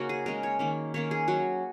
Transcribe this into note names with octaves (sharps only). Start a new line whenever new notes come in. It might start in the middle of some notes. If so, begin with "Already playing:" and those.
Already playing: C#3 A#3 C#4 D#4 F#4 A#4
G#4
C#3 G#3 C#4 A#4
C#5
D#3 A#3 C#4
D#3 A#3 C#4 C#5
G#4
F#3 C#4 F#4